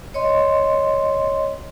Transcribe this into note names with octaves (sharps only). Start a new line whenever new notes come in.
C#5 D#5 C6